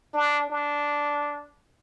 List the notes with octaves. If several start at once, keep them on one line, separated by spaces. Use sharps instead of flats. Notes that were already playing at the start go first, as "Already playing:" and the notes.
D4
D4